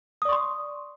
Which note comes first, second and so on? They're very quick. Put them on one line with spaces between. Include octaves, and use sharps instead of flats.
D#6 D5 C#6 C6